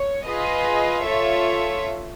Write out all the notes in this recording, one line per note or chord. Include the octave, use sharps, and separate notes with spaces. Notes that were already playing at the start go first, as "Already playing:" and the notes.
Already playing: C#5
F4 G#4 B4 D#5
F4 A4 C#5 E5